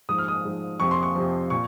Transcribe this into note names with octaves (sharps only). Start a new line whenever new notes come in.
G#2 F3 D#6
F6
D#6
G#2 F3
F2 C3 F3 C#6
C6
C#6
F2 C3 F3
A#2 C#6